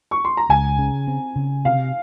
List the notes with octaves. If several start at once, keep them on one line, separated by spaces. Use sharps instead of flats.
C#6
C6
A#5
C#2 G#5
C#3
C4
C#3
C3 F5